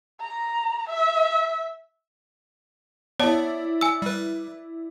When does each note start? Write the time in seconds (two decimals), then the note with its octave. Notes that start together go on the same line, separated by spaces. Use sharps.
0.20 A#5
0.89 E5
3.20 B3 E4 C#5 D5 A5
3.81 G#5 E6
4.02 G3 B4